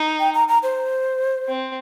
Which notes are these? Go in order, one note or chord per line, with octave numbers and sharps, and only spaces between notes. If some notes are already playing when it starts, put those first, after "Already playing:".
Already playing: D#4
G5
A#5
A#5
C5
C4